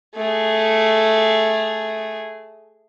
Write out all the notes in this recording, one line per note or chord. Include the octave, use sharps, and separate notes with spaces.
A3 G#4